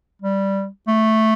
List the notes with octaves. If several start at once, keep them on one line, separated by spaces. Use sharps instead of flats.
G3
A3